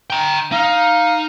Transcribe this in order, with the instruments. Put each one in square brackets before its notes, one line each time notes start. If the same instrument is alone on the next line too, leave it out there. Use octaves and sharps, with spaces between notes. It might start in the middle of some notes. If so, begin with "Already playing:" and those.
[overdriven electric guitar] G5 A#5
[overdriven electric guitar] D#4 [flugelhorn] F5